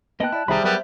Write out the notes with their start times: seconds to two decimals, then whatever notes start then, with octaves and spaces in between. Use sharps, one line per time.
0.20 A#3 B3 D#5 G5 A5 F#6
0.33 E4 D5 A5
0.48 C2 D#3 G3 G#4 C5 E5 A#5 B5
0.64 F#3 G3 B3 A#4